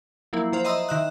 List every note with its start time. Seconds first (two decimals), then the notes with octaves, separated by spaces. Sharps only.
0.33 F3 F#3 A#3 E4
0.53 F3 C5 F5
0.65 D#5 E5 A#5 C6 D#6 E6
0.89 D#3 E5 F#6